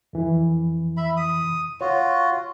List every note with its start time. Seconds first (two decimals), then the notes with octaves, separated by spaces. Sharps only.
0.13 F2 E3
0.97 E5 B5
1.17 D#6
1.81 F4 F#4 C#5